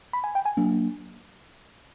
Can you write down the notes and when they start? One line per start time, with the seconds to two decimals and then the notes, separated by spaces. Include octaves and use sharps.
0.13 B5
0.24 G#5
0.35 G5
0.45 G#5
0.57 F#3 A#3 D4